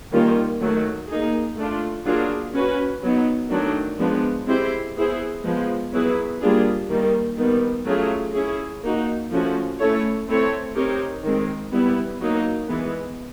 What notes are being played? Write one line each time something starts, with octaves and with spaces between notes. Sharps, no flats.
D#3 G3 A#3 C#4 F4
D#3 F#3 A3
A#3 D#4 G#4
A3 D4 F4
F#3 A#3 D4 F4 G#4
C#4 F#4 B4
F#3 B3 D#4
D#3 F#3 A3 D4
F3 G#3 B3 D4
G#3 C4 E4 G4 C5
B3 E4 G#4 C5
F3 G#3 B3
F#3 B3 E4 G#4 B4
G3 A#3 D4 F4 G#4
D#3 G3 A#3
D#3 G3 B3
F#3 A3 C#4 F4 G#4
C#4 E4 G#4
A#3 D#4 F#4
F3 A3 C#4 F#4
A3 C#4 E4 A4 C#5
A3 C4 E4 A4 C#5
C4 D#4 G4 A#4 C#5
D#3 G#3 C4
G3 B3 E4
F#3 A#3 D#4
E3 G#3 B3